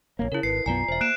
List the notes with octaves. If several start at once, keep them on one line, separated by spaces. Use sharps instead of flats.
A#1 E2 A#3 C#5
C#3 E4 A#4
G#1 B4 C7 C#7
B1 F#2 B3 F4 D5 G#5 A#5
E1 C5 E5
A#3 F#6 D7 E7